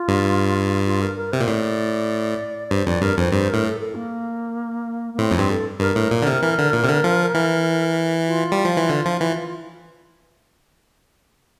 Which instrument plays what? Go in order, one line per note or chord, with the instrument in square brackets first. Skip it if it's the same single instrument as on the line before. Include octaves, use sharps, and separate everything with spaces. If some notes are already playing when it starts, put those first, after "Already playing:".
Already playing: [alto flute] F4
[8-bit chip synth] G2
[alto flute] F4
A#4
A#4
[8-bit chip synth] C3 [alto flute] C5
[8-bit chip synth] A#2
[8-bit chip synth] A2 [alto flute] D5
[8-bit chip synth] G2 [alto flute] C5
[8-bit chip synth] F2 [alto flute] D5
[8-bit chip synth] G2 [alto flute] A#4
[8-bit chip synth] F2 [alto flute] C5
[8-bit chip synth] G2 [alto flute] C5
[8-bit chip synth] A2 [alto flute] A#4
[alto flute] A4
A4
A#3
A#3
[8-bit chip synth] A2 [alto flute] C4
[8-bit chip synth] F2 [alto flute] C4
[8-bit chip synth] G2
[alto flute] A4
[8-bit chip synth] G2 [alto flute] A#4
[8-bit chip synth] A2
A#2
D3
C3
E3
D3
A#2
C3
D3
F3
E3
[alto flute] F4
[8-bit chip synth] G3
F3
E3
D3
F3
E3